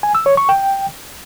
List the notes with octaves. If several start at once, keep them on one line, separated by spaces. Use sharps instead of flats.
G#5
E6
C#5
C#6
G5